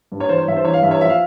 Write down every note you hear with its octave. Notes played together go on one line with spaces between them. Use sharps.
G2
C#5
E3 C5
C#5
G2 E5
C5
E3 C#5
F5
G2 E5
C#5
F3 E5
F5